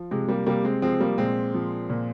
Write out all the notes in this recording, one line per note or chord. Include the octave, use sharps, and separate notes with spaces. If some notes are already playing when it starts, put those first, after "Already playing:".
Already playing: F3
C3 G#3
G3 A#3
C3 G3 A#3
G#3 C4
F3 G#3 C4
G3 A#3
A#2 G#3 C4
F3
A#2